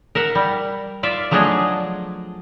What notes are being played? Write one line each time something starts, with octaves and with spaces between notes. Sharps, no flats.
A#4 E5 F#5
G3
F4 D5 E5
F3 F#3 A3 D4 G#4 D#5